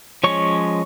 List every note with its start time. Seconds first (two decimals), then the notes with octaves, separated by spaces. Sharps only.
0.24 F3 G#3 C#4 C#5 C#6